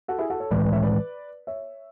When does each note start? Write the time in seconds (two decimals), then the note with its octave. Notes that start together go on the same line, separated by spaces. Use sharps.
0.08 F#4 A4
0.19 E4 G#4
0.30 F#4 A4
0.40 A4 C#5
0.51 A2 E3 G#3 B4 D5
0.61 B4 D5
0.72 C#5 E5
0.83 B4 D5
1.47 C#5 E5